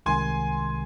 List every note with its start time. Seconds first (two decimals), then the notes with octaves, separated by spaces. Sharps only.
0.06 C2 C3 D#3 G#3 G#5 C6